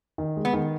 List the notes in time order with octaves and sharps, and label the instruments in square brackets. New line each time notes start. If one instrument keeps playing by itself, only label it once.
[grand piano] D#3
G#3
[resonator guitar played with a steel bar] B3
[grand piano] D#3